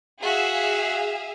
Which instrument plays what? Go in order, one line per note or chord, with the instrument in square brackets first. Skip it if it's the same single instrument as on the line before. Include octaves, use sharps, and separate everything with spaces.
[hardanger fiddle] F#4 [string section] G#4 E5 F5